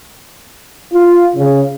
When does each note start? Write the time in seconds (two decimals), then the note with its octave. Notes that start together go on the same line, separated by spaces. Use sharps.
0.93 F4
1.36 C#3